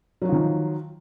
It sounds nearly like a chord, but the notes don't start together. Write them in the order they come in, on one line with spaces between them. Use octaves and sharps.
F#3 F#4 F3 D#3